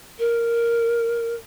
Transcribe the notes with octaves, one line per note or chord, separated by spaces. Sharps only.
A#4